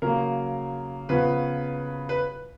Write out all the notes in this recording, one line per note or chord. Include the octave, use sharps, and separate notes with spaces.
C#3 F#3 A#3 A#4
C#3 F3 B3 B4
B4